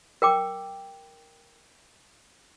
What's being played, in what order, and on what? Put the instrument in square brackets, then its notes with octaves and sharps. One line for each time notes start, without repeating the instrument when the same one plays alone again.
[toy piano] A#4 G5 D6